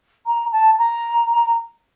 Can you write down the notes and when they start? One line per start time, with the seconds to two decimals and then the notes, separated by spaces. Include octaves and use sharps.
0.26 A#5
0.52 A5
0.78 A#5